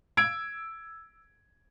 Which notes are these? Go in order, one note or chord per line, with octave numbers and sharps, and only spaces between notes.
E6 G#6 D7